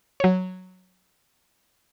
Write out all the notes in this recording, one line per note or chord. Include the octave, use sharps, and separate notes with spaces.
F#3 C#5